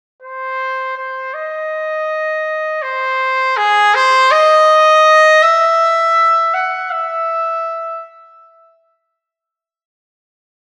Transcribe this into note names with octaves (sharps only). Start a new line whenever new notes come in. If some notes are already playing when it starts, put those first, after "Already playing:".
C5
C5
D#5
C5
G#4
C5
D#5
E5
F#5
E5